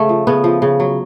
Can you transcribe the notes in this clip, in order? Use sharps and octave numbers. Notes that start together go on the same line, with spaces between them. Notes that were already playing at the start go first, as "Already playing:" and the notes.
Already playing: C#3 A3
F3
C#3 B3
F3
C#3
F#3